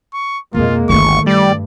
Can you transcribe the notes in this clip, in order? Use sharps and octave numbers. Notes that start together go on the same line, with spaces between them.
C#6
F2 B2 G#3 A#3 F4
G1 D2 D#3 A3 E4 C#6
G2 G3 D5